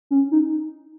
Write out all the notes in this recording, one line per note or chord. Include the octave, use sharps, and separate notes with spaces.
C#4
D#4